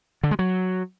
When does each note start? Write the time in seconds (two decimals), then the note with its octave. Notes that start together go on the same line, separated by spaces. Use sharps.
0.23 D3
0.31 G#3
0.39 F#3